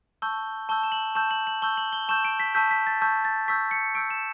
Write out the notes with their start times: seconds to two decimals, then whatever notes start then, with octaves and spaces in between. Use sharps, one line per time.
0.22 A5 C#6 E6 G6 G7
0.69 A5 C#6 E6 G6 G7
0.83 E7
0.92 F#7
1.15 A5 C#6 E6 G6 E7
1.31 F#7
1.47 F#7
1.62 A5 C#6 E6 G6 G7
1.77 F#7
1.93 G7
2.08 A5 C#6 E6 G6 E7
2.25 D7
2.40 B6
2.55 A5 C#6 E6 G6 B6
2.71 B6
2.87 A6
3.01 A5 C#6 E6 G6
3.25 A6
3.48 C#6 E6 G6 B6
3.71 C#7
3.95 C#6 E6 G6 D7
4.10 E7